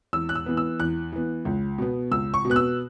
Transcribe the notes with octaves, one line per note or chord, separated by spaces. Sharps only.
E2 E6
F#6
E6
E3 B3
E6
E2 F#6
E3 B3
C#2
B2 B3
C#2 E6
C#6
B2
B3 F#6
E6